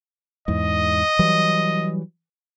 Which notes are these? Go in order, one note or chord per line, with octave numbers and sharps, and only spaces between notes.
E2 G#2 D#5
E3 F#3 G3